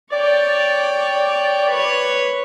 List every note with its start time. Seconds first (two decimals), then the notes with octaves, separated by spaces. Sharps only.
0.11 C#5 D5 G5
1.70 B4 C#5